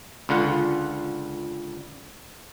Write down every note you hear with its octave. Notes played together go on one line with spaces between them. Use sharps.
C#2 D3 F4 F#5